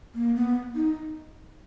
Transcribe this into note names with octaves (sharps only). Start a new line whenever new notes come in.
A#3
B3
D#4